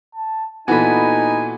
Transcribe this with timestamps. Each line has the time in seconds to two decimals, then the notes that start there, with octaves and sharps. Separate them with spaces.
0.15 A5
0.68 A#2 E3 B3 D#4 F#4 A4 G#5 B5